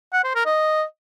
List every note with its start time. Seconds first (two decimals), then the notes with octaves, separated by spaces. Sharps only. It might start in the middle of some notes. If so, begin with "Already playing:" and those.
0.13 F#5
0.24 C5
0.35 A#4
0.46 D#5